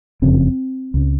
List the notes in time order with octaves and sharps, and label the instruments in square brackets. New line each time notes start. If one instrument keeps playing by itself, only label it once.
[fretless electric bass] F#1 F2 C#3 C4
C#2 C#3